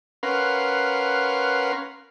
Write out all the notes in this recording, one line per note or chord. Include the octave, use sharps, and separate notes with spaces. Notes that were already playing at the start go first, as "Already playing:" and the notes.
C#4 A#4 B4 F5 F#5 C6